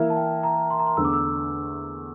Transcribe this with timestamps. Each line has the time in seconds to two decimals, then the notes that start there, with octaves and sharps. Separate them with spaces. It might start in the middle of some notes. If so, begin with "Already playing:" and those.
Already playing: E3 A#3 E4 E5
0.10 A5
0.17 G5
0.43 A#5
0.70 C6
0.79 A#5
0.87 C6
0.97 E2 D3 A3 E6
1.04 D6
1.13 E6